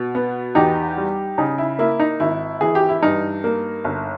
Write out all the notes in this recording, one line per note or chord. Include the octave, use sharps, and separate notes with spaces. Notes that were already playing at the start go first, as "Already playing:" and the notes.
Already playing: B2
B3
E2 D#4 G4
G3
C#3 D#4
E4
A#3 E4
D#4
G#1 E4
E3 G#4
G4
E4
G2 D#4
A#3
G1